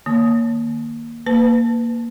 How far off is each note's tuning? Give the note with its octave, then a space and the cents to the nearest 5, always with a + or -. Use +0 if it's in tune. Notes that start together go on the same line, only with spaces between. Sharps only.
D#3 -15 A#3 +0 A5 +0
A#3 +0 B4 +20 A5 +0